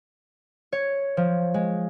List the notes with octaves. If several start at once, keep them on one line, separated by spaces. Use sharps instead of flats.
C#5
F3
G#3